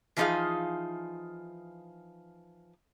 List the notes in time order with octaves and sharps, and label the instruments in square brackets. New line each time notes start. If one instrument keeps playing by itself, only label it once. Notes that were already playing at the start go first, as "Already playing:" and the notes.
[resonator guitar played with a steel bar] E3 F3 D#4 F4 G#4 F5